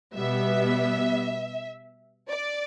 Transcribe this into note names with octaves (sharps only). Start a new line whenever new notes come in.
B2 G3 B3 E5
D5